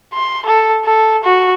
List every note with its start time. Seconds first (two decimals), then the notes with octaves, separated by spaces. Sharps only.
0.14 C6
0.46 A4
0.85 A4
1.24 F#4